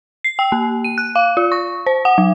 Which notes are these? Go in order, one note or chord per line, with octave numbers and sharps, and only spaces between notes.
C7
G5
A#3
D#7
F#6
F5
F4
C#6
C5
F#5
F#3